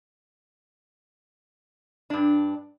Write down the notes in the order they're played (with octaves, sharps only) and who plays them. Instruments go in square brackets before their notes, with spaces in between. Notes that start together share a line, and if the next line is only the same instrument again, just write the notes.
[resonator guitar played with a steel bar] G2 D4